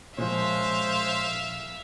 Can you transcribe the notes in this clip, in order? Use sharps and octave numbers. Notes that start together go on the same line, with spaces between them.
A#2 F3 G#3 C#4 C5 E5 F5